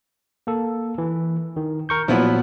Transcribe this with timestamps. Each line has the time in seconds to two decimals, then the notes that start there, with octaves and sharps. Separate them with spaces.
0.47 A#3 A4
0.98 E3
1.56 D#3
1.89 A#4 C#6 G6
2.08 A#2 F3 F#3 B3 E4